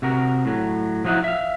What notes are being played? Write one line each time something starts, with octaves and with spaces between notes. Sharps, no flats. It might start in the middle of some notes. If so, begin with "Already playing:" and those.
C3 F#4 A#4
A2 F#3
F3 F#3 D#4 E4 F#5
E5 F5